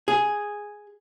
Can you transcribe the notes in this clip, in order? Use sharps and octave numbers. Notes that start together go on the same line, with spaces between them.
G#4